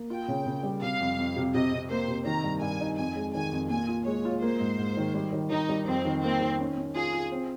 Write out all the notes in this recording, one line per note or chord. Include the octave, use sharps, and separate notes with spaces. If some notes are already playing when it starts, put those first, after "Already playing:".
Already playing: A#3
F4 G5
C#3
C#3
G3
C3 F5
F2
F2
C3
C3 D#5
C3
A#3 C5
C3
D#3 A#5
G2
G2 G#5
D#4
F2 G#5
G#3
D#3 G#5
F2
A#2 G#5
F4
G#3 C#5
F4
A#3 C5
G#2
G#2
D#3
G3
D#3
D#3 D#4
G3
F2 C4
D#3
A#3 C4
D#3
C#4
C#4
F4 G#4
F4
C4